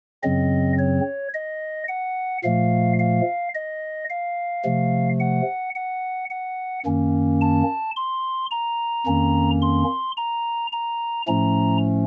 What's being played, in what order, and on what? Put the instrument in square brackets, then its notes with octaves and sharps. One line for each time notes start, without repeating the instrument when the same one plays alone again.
[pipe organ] F#2 C#3 F#3 C4 D#5
C#5
D#5
F#5
A#2 F3 A3 F5
F5
D#5
F5
C3 F3 A3
F#5
F#5
F#5
F#2 D#3 A#3 C#4
A5
C6
A#5
F2 D#3 A#3 C#4
C6
A#5
A#5
A2 F3 A3 C#4 A#5